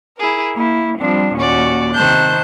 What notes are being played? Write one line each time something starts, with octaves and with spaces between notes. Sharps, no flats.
E4 G#4 A#4
A#3 E4
F3 G3 C4 D4
D#2 A#2 C#4 F#4 D5
C3 D#3 C5 A5 F#6 G6